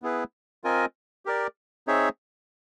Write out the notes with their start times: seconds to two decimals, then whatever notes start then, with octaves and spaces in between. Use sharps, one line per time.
0.02 B3 E4 G#4 B4
0.64 C4 F4 A#4 D#5 G#5
1.25 G4 A#4 D5
1.87 C4 D#4 G#4 C#5 E5